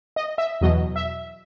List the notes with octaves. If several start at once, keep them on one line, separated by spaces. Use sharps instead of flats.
D#5
E5
E2 B2 F#3 D#5
E5